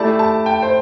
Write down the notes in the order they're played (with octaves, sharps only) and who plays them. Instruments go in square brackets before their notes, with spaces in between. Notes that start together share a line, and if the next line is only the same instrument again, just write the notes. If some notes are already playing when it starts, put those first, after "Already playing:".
Already playing: [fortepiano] A3 E4 G4 D5 [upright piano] A5
[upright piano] A5
G5
C5